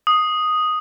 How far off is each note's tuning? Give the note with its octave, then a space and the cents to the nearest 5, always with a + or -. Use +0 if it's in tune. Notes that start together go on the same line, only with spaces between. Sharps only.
D#6 +0